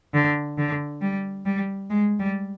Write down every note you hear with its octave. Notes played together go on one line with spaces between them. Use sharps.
D3
D3
G3
G3
G#3
G3